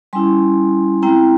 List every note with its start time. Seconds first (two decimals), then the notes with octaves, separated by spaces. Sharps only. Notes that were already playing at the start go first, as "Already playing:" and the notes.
0.13 G3 C#4 E4 G#5 C6
1.02 G#3 C4 E4 G5 A#5